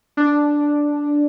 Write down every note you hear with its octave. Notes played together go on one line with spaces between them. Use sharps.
D4